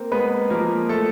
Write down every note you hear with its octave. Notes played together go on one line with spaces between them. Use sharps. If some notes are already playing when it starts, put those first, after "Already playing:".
Already playing: A#3 C4 A#4
G#3 B3 B4
F3 A#3 A#4
A3 A4